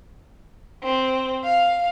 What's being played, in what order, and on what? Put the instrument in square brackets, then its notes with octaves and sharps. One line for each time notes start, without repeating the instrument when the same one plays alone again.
[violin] C4
F5